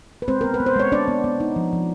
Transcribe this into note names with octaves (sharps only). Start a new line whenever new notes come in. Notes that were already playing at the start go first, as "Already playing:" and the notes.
B4
G#3 C4 C5
B3 A#4
B4
B3
C5
G#3 C#5
B3 D4 D5
B3
B3
D#4
F3
F3